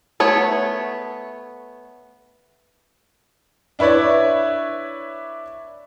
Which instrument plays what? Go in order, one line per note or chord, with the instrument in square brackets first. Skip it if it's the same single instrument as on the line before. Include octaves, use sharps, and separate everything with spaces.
[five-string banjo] A3 B3 C#5
[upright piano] D4 E4 B4 C#5 D5